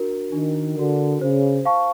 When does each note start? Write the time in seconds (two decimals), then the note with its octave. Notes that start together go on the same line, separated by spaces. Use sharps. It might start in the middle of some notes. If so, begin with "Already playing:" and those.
Already playing: D4 F#4 A#4
0.32 D#3 D4
0.77 D3 F#4 A#4
1.21 C#3 C5
1.65 F5 A5 C#6